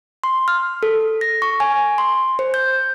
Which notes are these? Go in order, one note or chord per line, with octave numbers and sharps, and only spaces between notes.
C6
F6
A4
A#6
C#6
G#5
C6
C5
G6